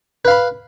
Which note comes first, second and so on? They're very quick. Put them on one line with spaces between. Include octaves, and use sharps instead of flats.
B4 F5 B5